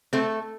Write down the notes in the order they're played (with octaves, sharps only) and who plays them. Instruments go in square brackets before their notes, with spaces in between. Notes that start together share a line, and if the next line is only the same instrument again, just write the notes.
[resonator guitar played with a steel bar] A3 C4